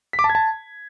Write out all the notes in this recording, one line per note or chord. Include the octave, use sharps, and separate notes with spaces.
B6
D6
A5
G#6
A5